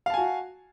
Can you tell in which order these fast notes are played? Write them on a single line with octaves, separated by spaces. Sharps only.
F5 A5 G#5 F#4